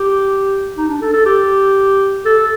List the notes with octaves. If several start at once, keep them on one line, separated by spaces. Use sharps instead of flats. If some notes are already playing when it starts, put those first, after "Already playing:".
Already playing: G4
D#4
D4
A4
A4
G4
A4